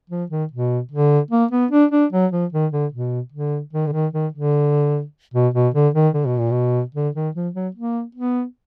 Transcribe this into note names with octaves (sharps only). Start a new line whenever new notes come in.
F3
D#3
B2
D3
A#3
B3
D4
D4
F#3
F3
D#3
D3
B2
D3
D#3
D3
D#3
D#3
D3
B2
B2
D3
D#3
D3
B2
A#2
B2
D3
D#3
F3
F#3
A#3
B3